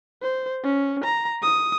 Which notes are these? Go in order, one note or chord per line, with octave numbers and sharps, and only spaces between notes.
C5
C#4
A#5
D#6